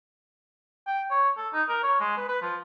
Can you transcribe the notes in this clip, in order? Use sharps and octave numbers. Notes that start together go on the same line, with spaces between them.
G5
C#5
A4
D#4
A#4
C#5
G#3
B4
B4
F3